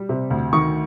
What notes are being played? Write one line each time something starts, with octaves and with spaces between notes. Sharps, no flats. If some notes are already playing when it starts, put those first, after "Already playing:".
Already playing: G3
C3
D2
D#3 C#6